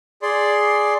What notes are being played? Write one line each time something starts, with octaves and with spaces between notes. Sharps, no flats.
G#4 D5 C6